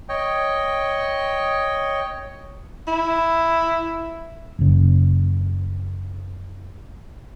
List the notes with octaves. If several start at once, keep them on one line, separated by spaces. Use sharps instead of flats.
C#5 D#5 G5
E4
F#1 C#3